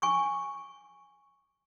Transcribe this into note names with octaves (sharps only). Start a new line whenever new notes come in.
G#5 C#6 D6